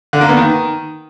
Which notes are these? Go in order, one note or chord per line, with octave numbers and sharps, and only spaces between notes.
D3
A#3
B3
D#3